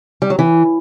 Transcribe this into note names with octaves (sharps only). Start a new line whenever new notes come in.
G3
F#3
E3